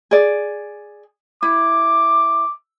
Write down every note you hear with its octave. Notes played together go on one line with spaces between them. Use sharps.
G#4 D5
E4 D6